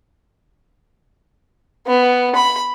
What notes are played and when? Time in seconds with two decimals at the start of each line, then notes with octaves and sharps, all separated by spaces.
1.87 B3
2.35 B5